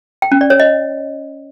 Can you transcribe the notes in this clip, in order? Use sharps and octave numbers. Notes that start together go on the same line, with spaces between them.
G5
C#4
D5
C#5
D#5